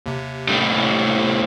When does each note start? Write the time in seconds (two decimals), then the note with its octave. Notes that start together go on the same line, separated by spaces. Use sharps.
0.06 D#2 C3
0.48 A2 G3